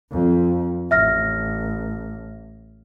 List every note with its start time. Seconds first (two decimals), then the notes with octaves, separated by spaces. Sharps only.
0.11 F2
0.91 A1 E5 F6 A#6